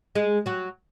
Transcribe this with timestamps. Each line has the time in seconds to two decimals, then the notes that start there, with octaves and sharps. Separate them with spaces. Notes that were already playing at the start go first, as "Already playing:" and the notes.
0.15 G#3 G#4
0.46 F#3 F#4